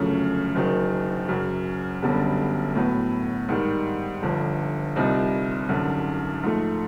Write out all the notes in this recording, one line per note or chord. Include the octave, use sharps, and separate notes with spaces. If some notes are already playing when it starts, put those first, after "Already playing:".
Already playing: G1 F#2 C#3 F3 A3
F#1 F#2 D#3 F#3
F#2 C#3 F#3
G1 F#2 D3 G3 B3
A2 F#3 B3
G#2 D#3 G3
G1 G2 D3 F3
C2 A#2 G3 C4 D#4
G#1 F#2 D3
G#2 F3 A3